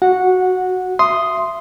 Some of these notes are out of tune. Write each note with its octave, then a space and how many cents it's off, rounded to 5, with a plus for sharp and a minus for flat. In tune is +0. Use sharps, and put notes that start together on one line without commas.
F#4 +0 F#5 -15
E5 +20 C6 +0 D#6 +0